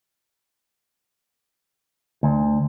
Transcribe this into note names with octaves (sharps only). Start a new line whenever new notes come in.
D2